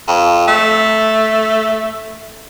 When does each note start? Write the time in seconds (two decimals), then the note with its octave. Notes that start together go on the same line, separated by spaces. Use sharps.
0.08 F2
0.48 A3